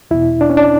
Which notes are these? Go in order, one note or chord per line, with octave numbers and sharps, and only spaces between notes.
E2 B2 E4
D4
C#4
D4